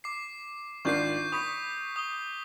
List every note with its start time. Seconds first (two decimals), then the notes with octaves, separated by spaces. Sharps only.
0.04 D6 C7
0.85 G#1 D4 F4 C#6 G6 C7
1.32 B5 C#6 D#6 B6
1.96 D#6 G7